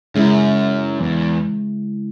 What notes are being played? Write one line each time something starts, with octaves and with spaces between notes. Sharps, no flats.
F#2 C#3 G#3 E4
E2